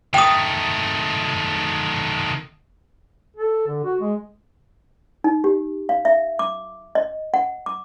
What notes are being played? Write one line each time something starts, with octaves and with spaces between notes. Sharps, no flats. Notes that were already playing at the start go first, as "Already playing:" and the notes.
D#3 A3 G5 D#6
A4
D3
F#4
G#3
D#4
G4
F5
E5
D6
D#5
F#5
D6